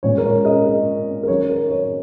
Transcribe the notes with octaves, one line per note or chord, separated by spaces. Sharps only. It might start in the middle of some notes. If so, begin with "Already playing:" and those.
A#2 G#3 C#4 C#5
A#4
C#5
A#4 D#5
A#4
A#4
D#3 F#3 C#4 C#5
A#4
C#5